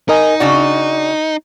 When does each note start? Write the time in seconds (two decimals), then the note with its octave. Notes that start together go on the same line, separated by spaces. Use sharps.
0.09 D#4 A#4 D#5 G#5
0.40 C#3 D4 F#4 D5